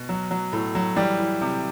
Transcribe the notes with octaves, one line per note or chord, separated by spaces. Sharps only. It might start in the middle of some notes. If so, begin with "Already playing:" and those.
Already playing: B2
F#3
F#3
A2
F#3
E3 G3
E3
C3